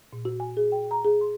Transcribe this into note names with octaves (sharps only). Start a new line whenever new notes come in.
A#2
F#4
G#5
G#4
G5
A#5
G#4
C6